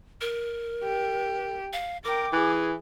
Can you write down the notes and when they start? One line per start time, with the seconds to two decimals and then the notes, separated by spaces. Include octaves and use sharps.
0.21 A#4
0.83 G4
1.73 F5
2.04 A#4 G5 D6
2.33 E3 G#4